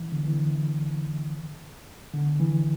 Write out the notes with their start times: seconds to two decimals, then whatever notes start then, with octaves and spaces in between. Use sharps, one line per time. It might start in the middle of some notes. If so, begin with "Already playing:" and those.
Already playing: E3
0.12 D3
0.25 E3
0.32 D3
2.14 D3
2.40 E3